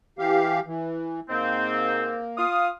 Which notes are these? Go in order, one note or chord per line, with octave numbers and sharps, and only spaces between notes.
E3 G4 F5
E3
G#2 A#3 C4
F4 F5 D#6